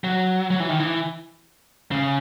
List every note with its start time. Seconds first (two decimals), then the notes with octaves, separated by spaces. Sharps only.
0.04 F#3
0.50 F#3
0.60 E3
0.69 D#3
0.80 E3
1.91 C#3